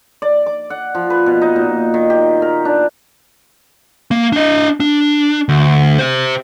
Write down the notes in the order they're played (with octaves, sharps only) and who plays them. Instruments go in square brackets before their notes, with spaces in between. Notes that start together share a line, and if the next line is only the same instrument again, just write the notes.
[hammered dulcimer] D5
D6
F#5
F3
B4
B2
D#4
A#2
D#3
G4
A#4
D4
[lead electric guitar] A#3
D4 D#5
D4
D2
G4 C5